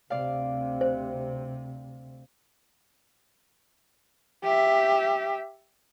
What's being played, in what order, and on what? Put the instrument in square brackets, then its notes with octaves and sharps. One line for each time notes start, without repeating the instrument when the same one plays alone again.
[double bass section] D2 C3 [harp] D5 F5
[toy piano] C5
[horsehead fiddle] G4 E5